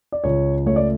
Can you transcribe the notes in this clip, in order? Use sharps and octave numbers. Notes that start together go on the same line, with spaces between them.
D5
C#2 C#5
A3 C#5
D5